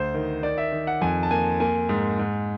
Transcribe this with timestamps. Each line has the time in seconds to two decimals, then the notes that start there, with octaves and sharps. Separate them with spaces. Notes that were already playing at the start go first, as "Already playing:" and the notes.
Already playing: D2 C5
0.14 D#3
0.43 D#3 D5
0.58 E5
0.72 D#3
0.87 F#5
1.01 F2 G#5
1.23 A5
1.31 A#3 G#5
1.60 A#3 G#5
1.89 G#2
2.19 G#2